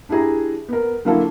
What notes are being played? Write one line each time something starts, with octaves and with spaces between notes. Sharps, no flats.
D4 E4 G4 G#4 A#5
B3 A#4
D3 F#3 A#3 E4 F4 A4